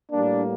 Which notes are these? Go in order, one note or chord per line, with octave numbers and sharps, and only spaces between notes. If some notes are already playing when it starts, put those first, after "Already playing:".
A2 G3 A#3 D4